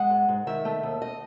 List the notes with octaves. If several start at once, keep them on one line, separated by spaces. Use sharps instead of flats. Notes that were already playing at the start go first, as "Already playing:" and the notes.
Already playing: G#3 F#5
G#2
G#2
D#3 E5
A3
D#2
D#5